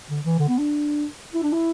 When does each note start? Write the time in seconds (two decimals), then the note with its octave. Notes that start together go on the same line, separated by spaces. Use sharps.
0.10 D3
0.25 E3
0.39 D3
0.48 B3
0.58 D4
1.34 E4
1.43 D4
1.52 E4